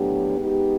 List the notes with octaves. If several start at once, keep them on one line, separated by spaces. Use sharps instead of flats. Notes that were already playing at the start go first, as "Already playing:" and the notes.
Already playing: A2 F#3 B3 D4 G4
G#3 B3 D#4 G4